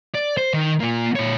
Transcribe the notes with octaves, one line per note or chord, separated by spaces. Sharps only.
D5
C5
D#3
A#3 F4
A#2 C#5